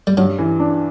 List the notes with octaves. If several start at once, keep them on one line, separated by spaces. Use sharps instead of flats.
G3
G2 F#3
E3
D4